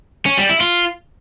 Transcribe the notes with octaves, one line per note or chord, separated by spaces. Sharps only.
C#4
G3
E4
F4